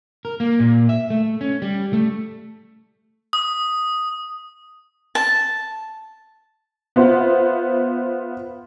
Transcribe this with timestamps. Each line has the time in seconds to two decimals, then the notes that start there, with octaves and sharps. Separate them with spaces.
0.25 A#4
0.40 A#3
0.60 A#2
0.89 E5
1.10 A3
1.41 C#4
1.62 G3
1.93 A3
3.33 D#6
5.15 A5
6.96 B3 F4 C5 E5 F#5